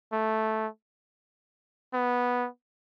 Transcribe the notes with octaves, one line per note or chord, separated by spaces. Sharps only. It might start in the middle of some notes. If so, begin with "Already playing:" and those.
A3
B3